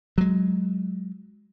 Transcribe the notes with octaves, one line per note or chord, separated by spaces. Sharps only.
F#3 G#3